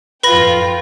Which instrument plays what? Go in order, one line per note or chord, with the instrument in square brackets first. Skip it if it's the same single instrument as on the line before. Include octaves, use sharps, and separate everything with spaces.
[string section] F2 F4 G5 [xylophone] B4 B5 A#6